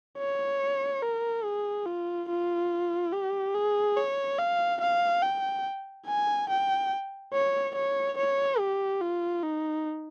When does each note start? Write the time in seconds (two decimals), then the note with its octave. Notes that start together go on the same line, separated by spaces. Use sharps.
0.18 C#5
1.03 A#4
1.45 G#4
1.86 F4
2.29 F4
3.13 G4
3.55 G#4
3.97 C#5
4.39 F5
4.81 F5
5.23 G5
6.07 G#5
6.49 G5
7.33 C#5
7.75 C#5
8.18 C#5
8.59 G4
9.01 F4
9.43 D#4